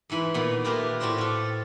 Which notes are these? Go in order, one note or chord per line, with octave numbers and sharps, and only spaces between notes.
E2 G#2 E3 B5
A#2 D#3 B3
A3 A#3 F4 G4 A#4 B4
A2 F#4 G4 C5 D5 A#5
F4 A4